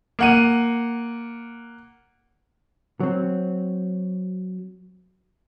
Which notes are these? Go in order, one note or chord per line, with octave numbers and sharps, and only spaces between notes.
A#3 F#5 D#7
F#3 C4